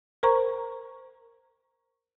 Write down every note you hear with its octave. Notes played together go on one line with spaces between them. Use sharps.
A#4 C5 A#5 C#6